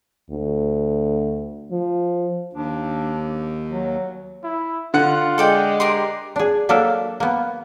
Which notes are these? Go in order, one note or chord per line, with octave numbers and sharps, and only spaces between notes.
D2
F3
D#2 D4
F#3
E4
D3 F4 F#5
G#3 A4 D5 G5
G4 A#4 D5 C6
D4 G#4
F#3 A#3 D4 A4 A#4 E5
A#3 B3